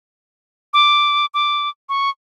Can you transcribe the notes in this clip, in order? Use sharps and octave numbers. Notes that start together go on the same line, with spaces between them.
D6
D6
C#6